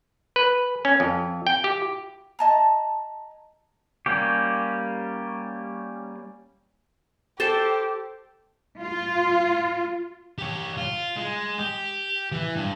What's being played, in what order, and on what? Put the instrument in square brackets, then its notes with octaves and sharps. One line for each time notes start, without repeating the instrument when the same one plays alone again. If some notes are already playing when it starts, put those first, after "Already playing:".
[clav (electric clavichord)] B4
C#4
F2
G5
G4
[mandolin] D#5 A5 A#5
[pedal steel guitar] G3 A#3 C#4 G4
[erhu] G4 [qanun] A4 C5 A5
[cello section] F4
[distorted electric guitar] G4 C#5
F4
G#3
G4
E3
G2